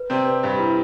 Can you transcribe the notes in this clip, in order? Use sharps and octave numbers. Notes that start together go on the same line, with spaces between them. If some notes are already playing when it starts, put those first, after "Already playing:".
Already playing: B4
C3 C4 D5
B4
G2 G3 D5
E4